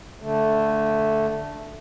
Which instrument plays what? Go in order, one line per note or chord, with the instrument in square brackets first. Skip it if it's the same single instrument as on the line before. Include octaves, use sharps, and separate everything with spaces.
[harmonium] D3 A3